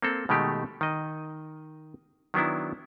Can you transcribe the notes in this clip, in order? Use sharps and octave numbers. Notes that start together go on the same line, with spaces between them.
A#3 C4 A4
B2 D#3 G#3 A3 G4
D#3 D#5
D#3 F#3 B3 D4 E4